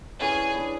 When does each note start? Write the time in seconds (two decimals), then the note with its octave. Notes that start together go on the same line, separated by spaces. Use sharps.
0.19 C#4 E4 G#4 B4 D5
0.55 D4 G#4 B4